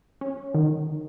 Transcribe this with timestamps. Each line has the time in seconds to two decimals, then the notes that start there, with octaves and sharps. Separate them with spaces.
0.21 C#4
0.54 D#3